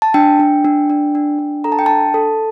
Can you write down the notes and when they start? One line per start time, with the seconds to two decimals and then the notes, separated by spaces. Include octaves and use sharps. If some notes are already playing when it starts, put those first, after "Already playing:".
0.02 A5
0.14 D4 G5
0.40 D4
0.65 D4
0.90 D4
1.15 D4
1.39 D4
1.64 A4 A#5
1.72 A5
1.79 G5
1.86 D4 A5
2.14 A4